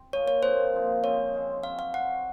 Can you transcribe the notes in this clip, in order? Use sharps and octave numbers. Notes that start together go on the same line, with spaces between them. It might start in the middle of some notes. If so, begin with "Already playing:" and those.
Already playing: C4
F3 A#3 F4 G#4 C#5
C#5
A#2 F3 C4 D#4 C5
A#2 F3 C4 D#4
C#3 G#3 C4 C#5
C#3 G#3 C4
F#3 C4 F#4 F5
F5
F#3 C4 F#4 F#5